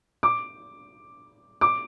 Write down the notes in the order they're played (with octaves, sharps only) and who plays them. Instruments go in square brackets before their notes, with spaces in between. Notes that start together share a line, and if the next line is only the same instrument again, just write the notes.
[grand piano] D6
D6